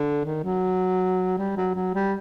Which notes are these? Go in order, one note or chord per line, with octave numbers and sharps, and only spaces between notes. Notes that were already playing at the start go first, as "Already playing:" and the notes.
Already playing: D3
D#3
F#3
G3
F#3
F#3
G3